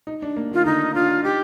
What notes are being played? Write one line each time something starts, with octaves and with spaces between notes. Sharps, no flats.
D#4
D4
A#3
D#3
F4
D3 D#4
D4 F4
D4
D#4 G4